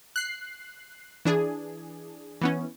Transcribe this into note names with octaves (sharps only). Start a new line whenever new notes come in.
F#6 C7
E3 D4 G#4
E3 B3 C#4